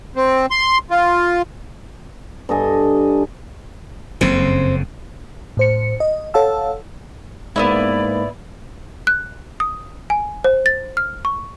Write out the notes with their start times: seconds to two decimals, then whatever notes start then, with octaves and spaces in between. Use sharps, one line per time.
0.16 C4
0.51 C6
0.90 F4
2.49 G2 A4 D#5 G#5
4.21 F#1 F2 C#3 C4
5.57 A2 C5 C#7
6.00 D#5
6.34 A4 C#5 F5 F#5 A5 E6
7.56 G#2 A#3 B3 C#4 E4 D5
9.07 F#6
9.60 D#6
10.10 G#5
10.44 C5
10.66 A6
10.97 F6
11.25 C#6